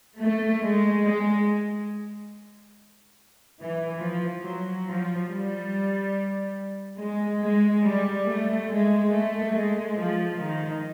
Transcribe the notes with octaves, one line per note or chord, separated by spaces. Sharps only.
A3
G#3
G#3
E3
F3
F#3
F3
G3
G#3
G#3
G3
A3
G#3
A3
G#3
F3
D#3